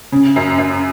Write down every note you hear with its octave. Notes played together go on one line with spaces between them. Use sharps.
C#3
F#2
F#2